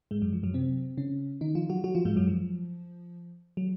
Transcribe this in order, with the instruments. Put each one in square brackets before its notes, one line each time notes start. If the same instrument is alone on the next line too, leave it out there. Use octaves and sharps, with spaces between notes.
[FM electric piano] G#2 G#3
F#2 F#3
F3
F#2 F#3
C3 C4
C#3 C#4
D#3 D#4
F3 F4
F#3 F#4
F#3 F#4
F3 F4
G#2 G#3
F#2 F#3
F3
F#3